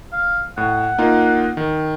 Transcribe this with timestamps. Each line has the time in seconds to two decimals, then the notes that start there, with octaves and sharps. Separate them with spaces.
0.13 F5
0.57 A2 F#5
0.98 A#3 D#4 F4
1.57 D#3